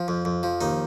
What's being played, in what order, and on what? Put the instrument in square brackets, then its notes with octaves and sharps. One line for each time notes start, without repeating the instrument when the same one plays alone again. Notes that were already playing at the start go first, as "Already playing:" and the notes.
Already playing: [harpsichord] F3
F2
F2
F3
D#2 D#4